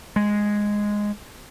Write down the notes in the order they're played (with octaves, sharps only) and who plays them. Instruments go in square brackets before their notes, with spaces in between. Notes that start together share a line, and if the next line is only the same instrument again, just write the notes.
[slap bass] G#3